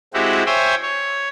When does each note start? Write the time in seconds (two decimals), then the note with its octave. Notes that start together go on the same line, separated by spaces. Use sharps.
0.14 G#3 C4 E4 F#4 G4
0.46 C5 C#5 E5 G5 G#5
0.82 C#5